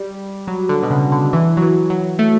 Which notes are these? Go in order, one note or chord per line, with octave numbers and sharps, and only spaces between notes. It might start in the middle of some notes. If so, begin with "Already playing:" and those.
Already playing: G3
F#3
D3
B2
C#3
D3
E3
F#3
E3
F#3
A3